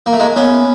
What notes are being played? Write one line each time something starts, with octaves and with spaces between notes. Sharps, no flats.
A#3
A3
G#3 A#3
B3 C#4